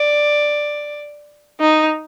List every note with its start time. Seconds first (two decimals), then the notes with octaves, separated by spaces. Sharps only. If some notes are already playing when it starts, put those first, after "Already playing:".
Already playing: D5
1.60 D#4